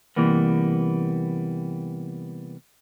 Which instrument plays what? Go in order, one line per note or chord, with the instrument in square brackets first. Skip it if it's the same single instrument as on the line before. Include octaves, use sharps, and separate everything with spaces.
[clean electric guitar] C3 E3 G3 A#3 B3